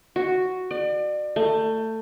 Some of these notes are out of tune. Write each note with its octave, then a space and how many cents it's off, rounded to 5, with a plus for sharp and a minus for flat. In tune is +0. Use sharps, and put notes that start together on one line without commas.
F#4 +0
D5 +35
A3 +20